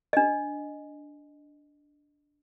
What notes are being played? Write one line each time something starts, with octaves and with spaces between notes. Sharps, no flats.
D4 D#5